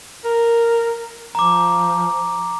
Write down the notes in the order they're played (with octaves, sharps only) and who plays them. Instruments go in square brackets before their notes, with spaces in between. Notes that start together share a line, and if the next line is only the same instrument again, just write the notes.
[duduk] A#4
[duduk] F3 [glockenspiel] A#5 D6